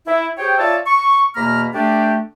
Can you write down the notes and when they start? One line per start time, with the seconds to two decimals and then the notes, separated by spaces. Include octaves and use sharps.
0.06 E4
0.38 G4 G#4 C5 C#5 G5
0.58 F4 C#5 D5 E5 A5
0.87 C#6
1.36 E2 B2 A#3 A#5 B5 F6
1.74 A3 D4 G4